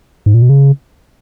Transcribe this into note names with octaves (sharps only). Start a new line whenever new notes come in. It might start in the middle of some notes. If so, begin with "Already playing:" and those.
G#2
A#2
B2
C#3